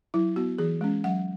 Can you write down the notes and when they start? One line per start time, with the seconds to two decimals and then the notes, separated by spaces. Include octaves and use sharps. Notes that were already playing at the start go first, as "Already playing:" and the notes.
0.14 F#3 E4
0.36 B3 F#4
0.58 E3 G#4
0.81 G#3 C#4
1.04 F#3 F#5